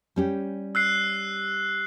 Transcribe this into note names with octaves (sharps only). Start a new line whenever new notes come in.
G3 C#4 G4
E6 F#6 C7